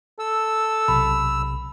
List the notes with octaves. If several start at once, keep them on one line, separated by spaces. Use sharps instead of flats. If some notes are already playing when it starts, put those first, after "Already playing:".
A4 E6
B1 C3 B5